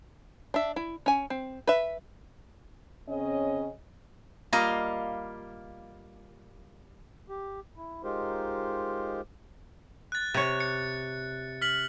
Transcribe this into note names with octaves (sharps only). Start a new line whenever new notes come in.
D4 E5
E4
C#4 G#5
C4
B4 E5
C#3 C4 C#4 D#5
G3 A#3 F4 D#5 F5 A#5
G4
E4
G#3 D#4 F4 G4 A#4 C5
F#6 A6
C3 C#5
C#7
F6 B6 F#7